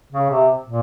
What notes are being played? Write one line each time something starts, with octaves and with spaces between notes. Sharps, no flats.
C#3
C3
A#2